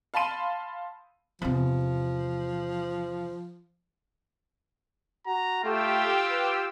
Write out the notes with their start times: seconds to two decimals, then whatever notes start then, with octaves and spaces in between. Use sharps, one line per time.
0.14 F5 A5 B5 C6 D#7
1.42 E2 C3 F3
5.26 F#4 A#5
5.63 A3 F4 G4 G5 E6
6.31 B4